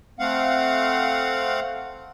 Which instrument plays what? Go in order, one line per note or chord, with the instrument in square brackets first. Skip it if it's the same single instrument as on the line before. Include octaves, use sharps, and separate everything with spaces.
[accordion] A3 C4 F5 F#5